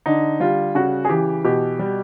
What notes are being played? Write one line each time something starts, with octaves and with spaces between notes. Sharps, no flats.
D3 D#4
G3 F4
C#3 F#4
G#4
E3 G4
B2 G4
G3